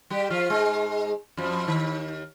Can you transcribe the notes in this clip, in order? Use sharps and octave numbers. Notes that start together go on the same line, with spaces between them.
G3 G4
F3 F4
G#2 G#3
F2 F3
D#2 D#3